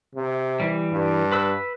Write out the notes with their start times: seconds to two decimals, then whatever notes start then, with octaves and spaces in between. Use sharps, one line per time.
0.15 C3
0.60 E3 G3
0.93 G2
1.32 B4 E6